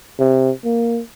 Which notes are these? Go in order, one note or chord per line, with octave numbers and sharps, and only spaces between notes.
C3
A#3